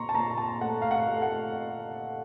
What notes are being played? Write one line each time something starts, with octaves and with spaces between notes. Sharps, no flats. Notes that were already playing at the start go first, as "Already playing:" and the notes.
Already playing: A#2 A#5 C6 C#6
A5
A#2 A#5
A5
A3 F#5
F5
F#5
A3
F#5